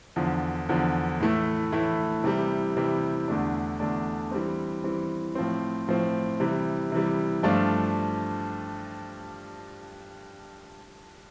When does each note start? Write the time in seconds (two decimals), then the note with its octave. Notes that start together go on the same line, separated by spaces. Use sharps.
0.16 E2 D3 F3
0.69 E2 D3 F3
1.20 A2 E3 A3 E4
1.72 A2 E3 A3 E4
2.24 C3 E3 G3
2.77 C3 E3 G3
3.28 E2 D3 A3 D4
3.80 E2 D3 A3 D4
4.31 E3 G3 C4
4.84 E3 G3 C4
5.35 A2 F3 C4
5.88 A2 F3 C4
6.40 C3 E3 G3
6.92 C3 E3 G3
7.43 G2 F3 A3 D4 F4